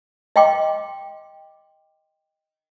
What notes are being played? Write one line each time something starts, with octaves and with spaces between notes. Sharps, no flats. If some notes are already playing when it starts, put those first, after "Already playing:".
D#5 F5 G5 C6 D6